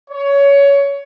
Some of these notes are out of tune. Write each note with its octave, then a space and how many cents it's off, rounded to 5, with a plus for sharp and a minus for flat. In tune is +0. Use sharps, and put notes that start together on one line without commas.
C#5 +20